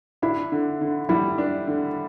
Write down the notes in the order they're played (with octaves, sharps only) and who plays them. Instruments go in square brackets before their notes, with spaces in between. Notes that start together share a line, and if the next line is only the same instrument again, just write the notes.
[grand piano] D4 [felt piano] E4
[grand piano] D3
D3
[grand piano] G3 [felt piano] E4
[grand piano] D4
D3